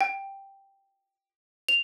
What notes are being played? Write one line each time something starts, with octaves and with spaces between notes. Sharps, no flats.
G5
F7